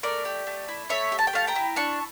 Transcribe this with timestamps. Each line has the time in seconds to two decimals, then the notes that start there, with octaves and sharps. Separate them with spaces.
0.03 A3 A#4 D5
0.25 G4
0.47 A3
0.68 E4
0.90 A3 C#5 E5
1.12 G4
1.19 A5
1.27 G5
1.33 A3 F5 A5
1.47 G5 A#5
1.56 E4
1.76 D4 A5 C#6